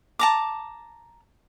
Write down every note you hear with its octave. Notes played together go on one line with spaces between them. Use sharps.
A5 A#5 D6